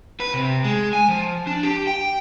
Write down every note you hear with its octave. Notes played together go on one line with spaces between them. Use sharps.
B4
C3
G#3
G#5
F3
D4
G4
G5